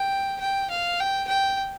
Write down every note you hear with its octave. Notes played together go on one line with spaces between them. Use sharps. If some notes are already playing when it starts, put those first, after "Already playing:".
Already playing: G5
G5
F5
G5
G5